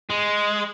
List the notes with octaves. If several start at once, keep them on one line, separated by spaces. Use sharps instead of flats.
G#3